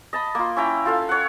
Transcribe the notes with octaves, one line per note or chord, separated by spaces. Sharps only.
D#5 A5 B5
A#3 F4
C#4 E4 G5 A#5
F4 A4 F5
C#5 F#5